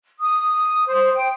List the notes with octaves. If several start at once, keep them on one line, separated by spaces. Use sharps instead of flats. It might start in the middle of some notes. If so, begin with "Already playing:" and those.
D#6
C5
G5